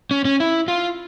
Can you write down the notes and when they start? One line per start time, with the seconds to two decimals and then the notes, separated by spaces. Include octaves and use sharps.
0.11 C#4
0.25 C#4
0.40 E4
0.68 F4